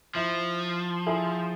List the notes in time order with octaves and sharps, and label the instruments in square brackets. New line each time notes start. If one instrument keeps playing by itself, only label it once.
[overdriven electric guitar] F3 [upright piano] E4
[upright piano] E4 G#4